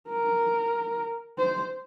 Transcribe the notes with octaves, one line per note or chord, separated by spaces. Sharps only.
A#4
C5